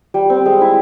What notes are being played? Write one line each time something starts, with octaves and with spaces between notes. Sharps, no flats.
G3
C4
G#3
E4